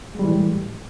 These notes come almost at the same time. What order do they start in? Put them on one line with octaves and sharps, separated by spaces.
G#3 G3 E3 A2